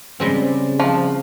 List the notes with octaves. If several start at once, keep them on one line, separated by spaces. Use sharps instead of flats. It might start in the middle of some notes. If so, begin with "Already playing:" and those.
C#3 G3 G#3 C4
F3